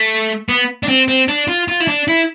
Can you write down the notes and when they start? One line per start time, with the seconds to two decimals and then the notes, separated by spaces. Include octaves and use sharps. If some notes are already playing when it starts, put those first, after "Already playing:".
Already playing: A3
0.49 B3
0.83 D4
0.88 C4
1.08 C4
1.28 D4
1.48 F4
1.68 F4
1.80 E4
1.88 D4
2.08 E4